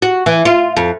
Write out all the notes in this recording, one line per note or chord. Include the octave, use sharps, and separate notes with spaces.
F#4
E3
F4
F2